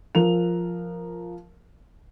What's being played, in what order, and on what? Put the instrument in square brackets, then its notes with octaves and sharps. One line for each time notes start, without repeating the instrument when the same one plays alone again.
[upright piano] F3 A#4 F7